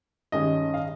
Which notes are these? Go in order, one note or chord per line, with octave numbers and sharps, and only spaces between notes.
G2 D#3 G#3 C#4 D#5
F5